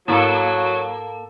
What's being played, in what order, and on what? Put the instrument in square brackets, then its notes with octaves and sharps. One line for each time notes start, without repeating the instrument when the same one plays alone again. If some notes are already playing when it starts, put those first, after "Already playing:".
[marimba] G#2 E4 [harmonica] F#3 [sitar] A#3 A4